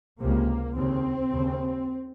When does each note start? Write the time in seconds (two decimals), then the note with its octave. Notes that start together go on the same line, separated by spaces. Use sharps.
0.20 C#2 C3 A#3
0.76 D#2 C#3 C4
1.32 D#2 C#3